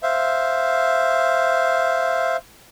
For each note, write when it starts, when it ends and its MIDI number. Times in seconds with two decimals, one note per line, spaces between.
0.03 2.37 72
0.03 2.37 76
0.03 2.37 77